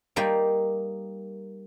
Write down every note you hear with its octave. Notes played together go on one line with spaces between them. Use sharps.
G3 A#3 D#4 G5